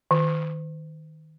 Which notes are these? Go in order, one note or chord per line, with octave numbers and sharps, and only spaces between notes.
D#3